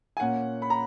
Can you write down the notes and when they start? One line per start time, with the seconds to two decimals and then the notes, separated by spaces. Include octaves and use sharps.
0.17 G#5
0.20 A#2 A#3 C#4 F#5
0.62 B5
0.70 A#5